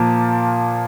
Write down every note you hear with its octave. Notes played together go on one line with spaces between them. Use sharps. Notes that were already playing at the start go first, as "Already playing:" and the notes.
Already playing: A#2 F3 A#3 A5